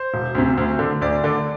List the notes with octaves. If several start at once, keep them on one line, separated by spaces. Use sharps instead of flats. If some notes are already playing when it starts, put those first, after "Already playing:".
Already playing: C5
E1
D2 C3
D2
D3
D2 D5
D3